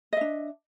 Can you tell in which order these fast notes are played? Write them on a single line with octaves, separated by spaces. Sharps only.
D#5 E5 D4